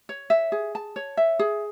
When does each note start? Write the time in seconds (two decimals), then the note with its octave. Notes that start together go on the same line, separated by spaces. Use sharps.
0.09 C#5
0.30 E5
0.52 G#4
0.75 A5
0.96 C#5
1.17 E5
1.39 G#4